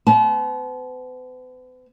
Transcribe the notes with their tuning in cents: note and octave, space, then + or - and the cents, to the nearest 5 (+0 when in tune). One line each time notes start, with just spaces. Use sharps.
B3 +45 A5 -35